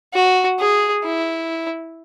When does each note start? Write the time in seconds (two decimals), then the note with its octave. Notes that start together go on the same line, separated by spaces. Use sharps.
0.13 F#4
0.59 G#4
1.04 E4